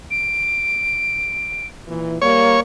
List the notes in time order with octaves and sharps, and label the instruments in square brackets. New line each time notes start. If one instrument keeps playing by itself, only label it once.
[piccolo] D7
[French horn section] A#2 E3
[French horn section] G3 A#3 [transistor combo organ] C#5